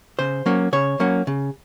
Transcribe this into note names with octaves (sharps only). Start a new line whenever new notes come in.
C#3 C5
F#3 A#3 C#4
C#3 C#5
F#3 A#3 C#4
C#3